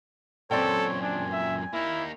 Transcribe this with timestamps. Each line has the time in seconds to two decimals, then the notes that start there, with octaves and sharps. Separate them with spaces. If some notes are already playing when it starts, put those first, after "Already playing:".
0.51 F#2 A#2 C4 A4 C#5 D5 G5
1.02 D4 G#5
1.32 E5
1.73 A#3 D#4 E4